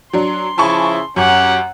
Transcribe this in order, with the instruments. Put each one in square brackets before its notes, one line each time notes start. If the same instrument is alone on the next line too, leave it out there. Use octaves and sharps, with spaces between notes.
[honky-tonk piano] F#3 D4 [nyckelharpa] C6
[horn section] C#3 F3 E4 [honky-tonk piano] G#5 A5 C#6
[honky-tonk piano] F#2 [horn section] C#4 G4 [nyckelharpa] F#5